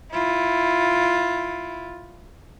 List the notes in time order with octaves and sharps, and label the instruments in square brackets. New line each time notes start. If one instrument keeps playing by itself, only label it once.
[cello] E4 F4